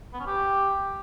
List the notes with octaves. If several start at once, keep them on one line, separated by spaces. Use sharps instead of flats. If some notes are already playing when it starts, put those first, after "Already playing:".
B3
C#4
G4